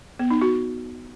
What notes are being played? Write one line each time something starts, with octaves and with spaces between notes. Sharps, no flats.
B3
D#4
F#4